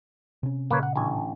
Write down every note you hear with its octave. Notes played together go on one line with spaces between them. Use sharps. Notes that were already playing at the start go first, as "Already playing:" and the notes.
C3 C#4
A#2 C#3 A#3 B4 C#5
F#5
A1 D2 G#5